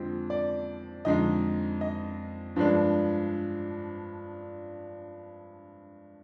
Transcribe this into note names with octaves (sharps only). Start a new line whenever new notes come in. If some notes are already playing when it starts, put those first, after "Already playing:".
Already playing: F2 D3 F3 G#3 C4
D5
F2 D3 G#3 D#4 D#5
D#5
G2 F3 G#3 D4